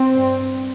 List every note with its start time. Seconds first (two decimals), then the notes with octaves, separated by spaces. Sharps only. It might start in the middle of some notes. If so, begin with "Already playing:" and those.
Already playing: C4
0.15 G2